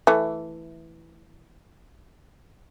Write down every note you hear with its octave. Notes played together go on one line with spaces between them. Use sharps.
E3 A3